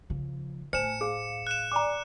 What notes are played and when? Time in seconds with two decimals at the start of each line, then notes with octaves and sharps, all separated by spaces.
0.10 C#3 F3
0.73 A2 A3 C5 G#5 C#7 E7
1.01 G#4 F5
1.47 F#6 E7
1.72 D5 G#5 A#5 D6